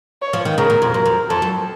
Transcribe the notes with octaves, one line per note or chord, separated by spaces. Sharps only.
C#5
F3
D#3
C#3 A#4
A#2
F2
F#2 A#4
F2
F2 A4
F#2